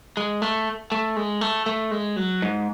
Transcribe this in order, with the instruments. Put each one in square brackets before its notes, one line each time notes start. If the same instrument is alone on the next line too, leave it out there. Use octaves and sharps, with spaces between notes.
[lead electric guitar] G#3
A3
A3
G#3
A3
A3
G#3
F#3
G#2